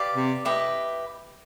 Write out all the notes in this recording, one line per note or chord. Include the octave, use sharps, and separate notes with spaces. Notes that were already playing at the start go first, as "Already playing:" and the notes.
Already playing: G4 B4 D5 F5
C3
E4 G4 B4 D#5